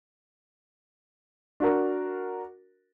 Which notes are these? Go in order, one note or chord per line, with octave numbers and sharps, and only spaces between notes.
D4 F#4 A#4